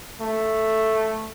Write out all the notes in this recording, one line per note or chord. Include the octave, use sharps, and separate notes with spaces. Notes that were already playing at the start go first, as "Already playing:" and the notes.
A3